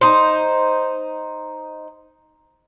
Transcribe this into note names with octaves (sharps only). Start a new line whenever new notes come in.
D#4 C5